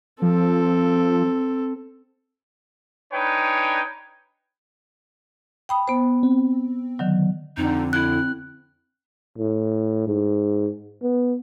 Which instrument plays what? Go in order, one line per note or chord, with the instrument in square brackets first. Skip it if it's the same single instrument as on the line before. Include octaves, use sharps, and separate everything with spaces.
[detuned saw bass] F3 [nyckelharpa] C4 A4
[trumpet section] D4 D#4 B4 C#5 G5 G#5
[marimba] G5 B5 D#6
B3 C5
[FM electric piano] C4
[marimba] D3 D#3 F#3
[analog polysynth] F2 D3 [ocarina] C4 [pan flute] D#4
[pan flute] E4 [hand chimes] F#6
[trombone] A2
G#2
B3